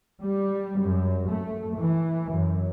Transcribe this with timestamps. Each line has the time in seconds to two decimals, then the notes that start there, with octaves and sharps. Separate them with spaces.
0.22 G3
0.80 F#2
1.29 A3
1.76 E3
2.31 F#2